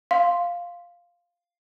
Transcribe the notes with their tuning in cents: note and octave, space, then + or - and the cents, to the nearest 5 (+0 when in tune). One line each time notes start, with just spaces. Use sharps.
F5 +0 C6 +0